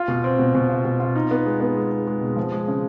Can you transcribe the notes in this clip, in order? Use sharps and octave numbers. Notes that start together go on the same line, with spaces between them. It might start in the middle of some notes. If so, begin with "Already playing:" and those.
Already playing: F4
B2
C4
B2
B2
F4
B2
F4
D#4
B3
G#3
B3
G#3
G#3
G#3
B2
F3
G#3
C#3